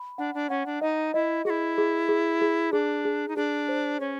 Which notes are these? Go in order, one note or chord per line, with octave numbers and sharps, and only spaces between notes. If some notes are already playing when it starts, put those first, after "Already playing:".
Already playing: B5
D4 F#5
D4
C#4 F#5
D4
D#4 D#5
E4 D#5
E4 F#4 G#4
G#4
G#4
G#4
D4 G#4
G#4
D#4
D4 G#4
C5
C#4 C#5